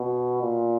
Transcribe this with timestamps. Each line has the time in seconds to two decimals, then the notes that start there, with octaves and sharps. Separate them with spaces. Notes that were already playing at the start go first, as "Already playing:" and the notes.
Already playing: B2
0.42 A#2